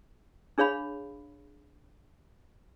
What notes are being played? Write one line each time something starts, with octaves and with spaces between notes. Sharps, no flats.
D4 G#4 C#5 F5 B5